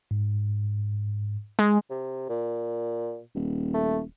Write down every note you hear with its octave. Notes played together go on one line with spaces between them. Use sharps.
G#2
G#3
C3
A#2
D#1
A3